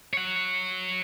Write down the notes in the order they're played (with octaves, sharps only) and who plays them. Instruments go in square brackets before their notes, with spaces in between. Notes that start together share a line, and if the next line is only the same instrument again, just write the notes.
[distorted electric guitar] C#5 F#5